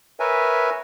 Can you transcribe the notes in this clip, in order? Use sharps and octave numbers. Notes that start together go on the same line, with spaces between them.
A#4 B4 C#5 E5 G#5